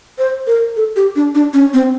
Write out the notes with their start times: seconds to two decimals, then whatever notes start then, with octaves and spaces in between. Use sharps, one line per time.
0.18 C5
0.47 A#4
0.76 A4
0.96 G4
1.16 D4
1.35 D4
1.53 C#4
1.74 C4